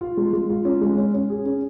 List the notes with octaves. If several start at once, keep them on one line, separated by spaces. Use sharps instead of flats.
F4
G#3
G#3
F4
C#4
G#3
C#4
C#4
G#4
C#4